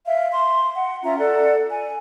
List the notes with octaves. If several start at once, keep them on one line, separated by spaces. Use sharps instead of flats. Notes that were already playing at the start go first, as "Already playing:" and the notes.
E5 F5
C6
F#5
C#4 F4 E5 A#5
A4 D5 F#5
G#5